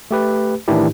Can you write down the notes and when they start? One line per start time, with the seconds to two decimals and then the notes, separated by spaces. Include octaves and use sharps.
0.11 A3 G4 B4
0.68 A2 D#3 E3 D4 E4 G4